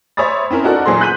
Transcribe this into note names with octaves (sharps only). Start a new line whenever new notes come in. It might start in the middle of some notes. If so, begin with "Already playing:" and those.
C5 C#5 E5 B5 D#6 A6
C4 C#4 E4 A#4
D#4 F#4 A4 A#4 D5
E2 A#2 F#3 G#4 C5 C6
F#6 G6 B6 D#7 F#7